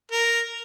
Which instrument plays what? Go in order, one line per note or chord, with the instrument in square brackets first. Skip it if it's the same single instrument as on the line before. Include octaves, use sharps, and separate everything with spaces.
[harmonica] A#4